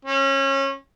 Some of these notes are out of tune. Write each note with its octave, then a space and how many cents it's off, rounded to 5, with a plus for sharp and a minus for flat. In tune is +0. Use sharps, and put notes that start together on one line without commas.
C#4 -25